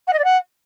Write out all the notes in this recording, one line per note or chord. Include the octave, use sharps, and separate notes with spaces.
F#5
D#5
D5
F#5